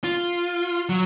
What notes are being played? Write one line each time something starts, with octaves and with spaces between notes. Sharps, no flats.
F4
F#3